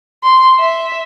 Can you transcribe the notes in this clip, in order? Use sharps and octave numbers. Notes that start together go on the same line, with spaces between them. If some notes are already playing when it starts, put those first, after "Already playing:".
C6
E5